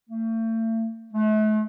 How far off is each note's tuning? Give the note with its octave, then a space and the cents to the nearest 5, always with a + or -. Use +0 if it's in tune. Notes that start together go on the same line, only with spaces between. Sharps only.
A3 +40
A3 -40